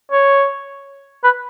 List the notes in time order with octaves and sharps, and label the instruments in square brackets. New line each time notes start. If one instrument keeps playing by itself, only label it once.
[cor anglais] C#5
B4